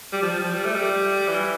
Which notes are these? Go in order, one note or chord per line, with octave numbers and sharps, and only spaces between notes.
G3
F3
F3
F3
G3
A3
G3
E3